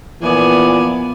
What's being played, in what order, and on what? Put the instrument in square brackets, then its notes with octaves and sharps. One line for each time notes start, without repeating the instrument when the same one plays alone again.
[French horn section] A#2 E3 F3 [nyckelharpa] B3 [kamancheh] D5 G#5